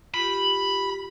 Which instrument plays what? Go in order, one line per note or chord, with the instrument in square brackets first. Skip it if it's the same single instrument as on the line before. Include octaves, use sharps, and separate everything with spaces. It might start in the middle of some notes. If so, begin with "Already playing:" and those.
[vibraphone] F4 G4 [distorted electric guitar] B5